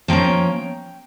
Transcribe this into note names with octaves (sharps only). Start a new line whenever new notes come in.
F3 A#3 C#4 G5